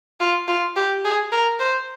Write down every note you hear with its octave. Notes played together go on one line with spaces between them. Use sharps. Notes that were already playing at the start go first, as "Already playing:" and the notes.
F4
F4
G4
G#4
A#4
C5